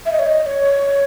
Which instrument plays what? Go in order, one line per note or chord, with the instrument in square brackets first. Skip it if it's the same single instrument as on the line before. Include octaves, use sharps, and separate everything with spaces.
[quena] E5
D#5
C#5
D#5
C#5